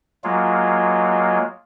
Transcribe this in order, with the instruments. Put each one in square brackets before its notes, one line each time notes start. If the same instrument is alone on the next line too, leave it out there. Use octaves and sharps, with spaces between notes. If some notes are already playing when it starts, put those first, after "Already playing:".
[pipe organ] F#3 G#3 A#3 F4